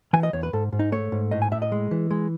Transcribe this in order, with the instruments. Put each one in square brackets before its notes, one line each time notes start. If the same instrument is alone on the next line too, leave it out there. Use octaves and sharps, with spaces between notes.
[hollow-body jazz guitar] E3 G#5
D#5
E2 C#5
B4
G#2 A4
G#2
D#4
A3 C#5
G#2
A2 D#5
G#5
A2 E5
D#5
G#3
E3
G#3